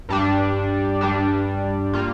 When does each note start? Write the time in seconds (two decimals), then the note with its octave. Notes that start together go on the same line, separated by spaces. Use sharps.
0.09 G2 G3 D4
1.01 G2 G3 D4
1.93 G3 A#3 F4